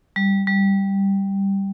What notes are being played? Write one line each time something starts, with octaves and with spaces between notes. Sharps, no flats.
G3
G3